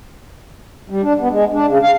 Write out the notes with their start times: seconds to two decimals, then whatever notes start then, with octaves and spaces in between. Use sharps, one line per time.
0.90 G3
1.03 D4
1.20 B3
1.31 G#3
1.53 D4
1.67 C#3
1.82 F5